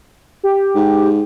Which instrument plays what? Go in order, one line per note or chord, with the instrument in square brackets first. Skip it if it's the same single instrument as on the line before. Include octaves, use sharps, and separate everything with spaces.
[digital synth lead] G4
[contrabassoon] G#2